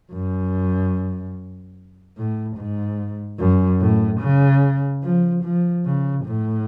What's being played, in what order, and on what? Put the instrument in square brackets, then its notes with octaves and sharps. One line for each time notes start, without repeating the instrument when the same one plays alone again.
[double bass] F#2
A2
G#2
F#2
A2
C#3
F3
F3
C#3
A2